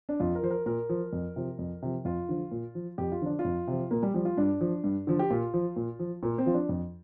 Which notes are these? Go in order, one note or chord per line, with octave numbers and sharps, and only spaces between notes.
D4
F2 F4
A#4
F3 C5
A#4
A#2 A#4
F3
F2
C3 F3
F2
C3 F3
F2 F4
D3 F3
A#2
F3
F2 G4
F4
D3 F3 D4
F4
F2
C3 F3
A#2 A#3
G3
F3 G3
F4
G2 D4
F3
G2
D3 F3
G4
A#2 F4
F3
A#2
F3
A#2 A#3
C4
F3 F4
D4
F2